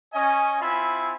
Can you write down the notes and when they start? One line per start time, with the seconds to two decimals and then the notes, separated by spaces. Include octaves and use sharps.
0.14 C#4 D#5 G#5
0.61 C4 E4 F4 E5 G#5 B5